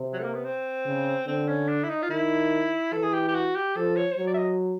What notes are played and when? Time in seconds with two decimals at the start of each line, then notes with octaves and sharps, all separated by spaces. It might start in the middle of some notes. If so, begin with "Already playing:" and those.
Already playing: C3
0.13 F#3
0.19 A3
0.24 A#3
0.34 B3
0.44 C4
0.86 C#3
1.27 D3 C4
1.48 C#4
1.68 D4
1.84 E4
1.89 D#4
2.02 F4
2.10 D#3 E4
2.92 E3 A4
3.03 G#4
3.13 G4
3.28 G4
3.35 F#4
3.55 G4
3.76 F3 A4
3.97 C#5
4.12 C5
4.17 F#3 C#5
4.27 D5
4.34 E5
4.38 D#5